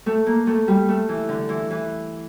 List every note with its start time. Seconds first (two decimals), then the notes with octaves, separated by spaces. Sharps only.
0.06 A3
0.26 A#3
0.47 A3
0.68 G3
0.89 A3
1.09 E3
1.29 D3
1.49 E3
1.70 E3